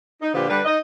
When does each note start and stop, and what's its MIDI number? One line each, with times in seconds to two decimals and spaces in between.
0.21 0.32 63
0.34 0.47 46
0.34 0.47 50
0.34 0.47 53
0.34 0.47 65
0.34 0.47 67
0.34 0.47 71
0.49 0.60 50
0.49 0.60 55
0.49 0.60 62
0.49 0.60 71
0.65 0.77 63
0.65 0.77 75